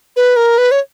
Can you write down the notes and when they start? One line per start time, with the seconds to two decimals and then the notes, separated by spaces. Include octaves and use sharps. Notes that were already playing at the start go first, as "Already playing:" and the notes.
0.16 B4
0.36 A#4
0.58 B4
0.71 C#5